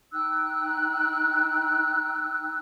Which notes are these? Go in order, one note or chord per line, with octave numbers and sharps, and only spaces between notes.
D#4 G5 E6 F#6